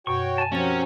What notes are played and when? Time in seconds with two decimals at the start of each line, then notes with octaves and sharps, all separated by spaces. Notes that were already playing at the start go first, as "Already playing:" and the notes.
0.07 F#2 B2 F#4 C#5 G5 C#6
0.38 G#5 A5
0.52 F3 F#3 C4 C#4 F#4 G4 A#4 A6